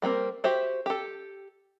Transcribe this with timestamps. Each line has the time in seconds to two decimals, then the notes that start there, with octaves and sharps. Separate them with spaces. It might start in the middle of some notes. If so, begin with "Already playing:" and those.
0.02 G3 A#3 C4 A#4
0.44 F#4 G4 C5 E5
0.86 G4 A4